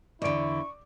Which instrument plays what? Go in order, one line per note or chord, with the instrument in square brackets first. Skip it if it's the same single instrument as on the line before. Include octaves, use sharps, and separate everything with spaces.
[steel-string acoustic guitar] E2 D3 [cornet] E4 [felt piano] D5 D7 [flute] C#6